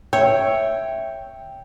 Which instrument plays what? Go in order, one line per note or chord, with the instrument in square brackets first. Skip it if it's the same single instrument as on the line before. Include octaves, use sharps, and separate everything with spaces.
[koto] C#5 [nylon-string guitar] E5 [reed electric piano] G5